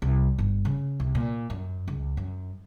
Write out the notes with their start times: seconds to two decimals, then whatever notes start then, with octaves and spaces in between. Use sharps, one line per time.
0.02 C2
0.39 G1
0.65 C#3
1.00 C2
1.15 A#2
1.50 F#2
1.88 C#2
2.17 F#2